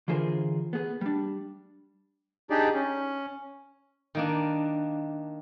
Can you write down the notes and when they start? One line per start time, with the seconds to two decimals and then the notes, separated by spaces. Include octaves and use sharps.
0.08 D3 E3 F4 G#4 A#4 C5
0.73 B3 G#4
1.01 G3 D4
2.50 D4 D#4 G4 G#4 D5
2.74 C#4
4.15 D#3 A#3 D4